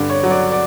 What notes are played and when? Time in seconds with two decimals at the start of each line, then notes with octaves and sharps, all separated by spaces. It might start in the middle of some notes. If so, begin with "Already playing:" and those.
Already playing: G2 D3 D5
0.10 C#5
0.23 F#3
0.31 D5
0.52 D5